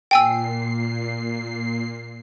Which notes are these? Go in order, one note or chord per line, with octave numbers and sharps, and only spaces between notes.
A#2 G5 G#5 E6 C7